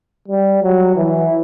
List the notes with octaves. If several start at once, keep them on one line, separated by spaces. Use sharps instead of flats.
G3
F#3
E3